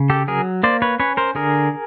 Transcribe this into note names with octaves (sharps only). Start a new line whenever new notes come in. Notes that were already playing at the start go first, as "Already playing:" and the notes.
Already playing: C#3
G4 A4
F#3 G#4 A#4
A#3 C5 D5
B4 C#5
C#4 B4 C#5
A#4 C5
D3 G#4 A#4